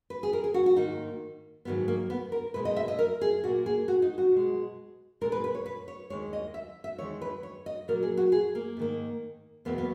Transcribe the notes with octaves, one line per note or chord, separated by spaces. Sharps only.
B4
G#4
A#4
G#4
F#4
F#4
G#2 D#3 A#3 D#4
G#2 D#3 F#3 A#3 B3
A#3
B3
A#4
B2 G#3 B4
D#5
E5
D#5
A#4
G#4
A#2 A#3 F#4
G#4
F#4
D#4
F#4
B2 G#3
A#2 G#3 A#4
B4
B4
C#5
B4
C#5
D#2 D#3 G#3 C#5
D#5
E5
E5
E2 D#3 G#3 C#5
B4
C#5
D#5
A#2 F#3 A#3 A#4
G#4
F#4
G#4
A#3
G#2 D#3 A#3
E2 B2 F#3 A#3 B3
B3